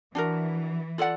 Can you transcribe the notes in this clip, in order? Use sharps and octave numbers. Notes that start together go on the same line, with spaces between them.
E3 D4 F#4 A#4
F4 A4 D5 F#5